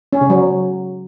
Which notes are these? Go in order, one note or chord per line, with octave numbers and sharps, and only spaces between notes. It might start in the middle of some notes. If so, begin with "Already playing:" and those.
C#4
C#3
F#3